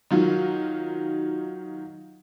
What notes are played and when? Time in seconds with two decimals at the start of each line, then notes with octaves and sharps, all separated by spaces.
0.11 D#3 F#3 F4